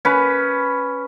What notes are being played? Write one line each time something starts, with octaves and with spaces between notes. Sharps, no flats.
C#4 B4